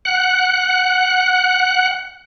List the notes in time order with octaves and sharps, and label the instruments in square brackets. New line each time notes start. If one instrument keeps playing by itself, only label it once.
[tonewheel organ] F#5 F#6